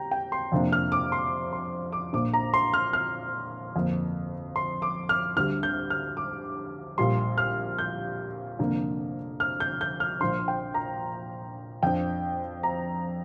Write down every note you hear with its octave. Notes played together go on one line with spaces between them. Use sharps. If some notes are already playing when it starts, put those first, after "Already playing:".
Already playing: G3 G5 A#5
G5
C6
F2 C3 F3 A#3 D4
F6
D6
C6
C6
D6
A#1 A#2 A#3 D4 D6
A#5
C6
F6
F6
G1 F2 F3 A#3
C6
D6
F6
D2 D3 G3 F6
G6
F6
D6
A#1 A#2 G3 C6
F6
G6
F1 F2 D3 A#3 D4
F6
G6
G6
F6
A#1 A#2 F3 D4 C6
G5
A#5
F2 F3 D4 G5
A#5